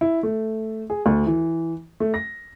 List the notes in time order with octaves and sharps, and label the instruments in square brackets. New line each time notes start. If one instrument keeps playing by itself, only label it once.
[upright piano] E4
A3
G#4
D2
E3
A3
A#6